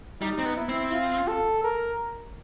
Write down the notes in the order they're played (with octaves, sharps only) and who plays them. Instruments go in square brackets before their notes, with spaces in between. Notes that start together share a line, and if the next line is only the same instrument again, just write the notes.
[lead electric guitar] G3 [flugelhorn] D#4
[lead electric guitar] C4
B3
[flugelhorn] E4
[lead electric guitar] C4
[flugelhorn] F4
A4
A#4